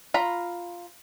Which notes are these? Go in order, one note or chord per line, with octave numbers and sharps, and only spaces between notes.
F4 A#5 B5